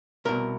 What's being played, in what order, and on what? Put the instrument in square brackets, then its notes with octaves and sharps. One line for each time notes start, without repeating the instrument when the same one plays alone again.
[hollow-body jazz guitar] C2 B2 A#4